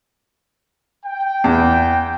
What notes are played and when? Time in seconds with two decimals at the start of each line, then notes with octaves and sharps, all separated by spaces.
1.05 G5
1.44 E2